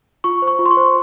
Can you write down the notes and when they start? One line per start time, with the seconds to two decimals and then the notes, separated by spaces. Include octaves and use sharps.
0.24 F4 C#6
0.42 C5
0.47 C#6
0.59 F4
0.66 C6
0.71 C#6
0.77 C5